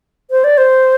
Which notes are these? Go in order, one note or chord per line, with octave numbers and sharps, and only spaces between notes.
C5
D5
C5